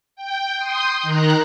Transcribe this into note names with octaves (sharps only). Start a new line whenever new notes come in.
G5
C6 D#6 G6
D#3 A#5 F#6